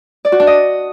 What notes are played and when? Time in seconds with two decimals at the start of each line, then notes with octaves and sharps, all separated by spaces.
0.25 D5
0.32 F#4
0.40 D4
0.47 D#5